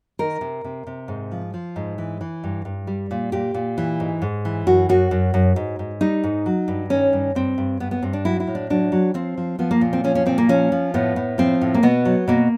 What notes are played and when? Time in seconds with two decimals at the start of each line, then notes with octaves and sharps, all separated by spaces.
0.19 D#3 A#4
0.41 C3
0.64 C3
0.87 C3
1.08 G#2
1.32 F3
1.54 F3
1.76 G#2
1.98 E3
2.21 E3
2.44 G2
2.65 G2
2.87 G3
3.11 A#2
3.32 A#2 G4
3.54 A#2
3.78 E3
4.00 G#2
4.22 G#2
4.45 E3
4.67 F#2 F#4
4.89 F#2 F#4
5.11 F#2
5.34 F#2
5.56 G#2
5.79 G#2
6.01 G3 D#4
6.24 G#2
6.46 F#3
6.68 G2
6.90 D#3 C#4
7.13 G2
7.35 G2 C4
7.58 G2
7.80 G2 B3
7.91 B3
8.02 G2 C4
8.13 D4
8.25 F#3 E4
8.40 E4
8.47 A2
8.55 D4
8.70 F#3 D4
8.92 F#3
9.14 F3 C4
9.38 F3
9.59 F3 B3
9.71 A#3
9.81 A#2
9.93 C4
10.04 F3 C#4
10.15 C#4
10.26 A#2 C4
10.38 A#3
10.49 F3 C#4
10.72 F3
10.94 A2 B3
11.16 A2
11.38 F3 C4
11.61 A2
11.74 A#3
11.83 B2 B3
12.05 F#3
12.28 B2 A#3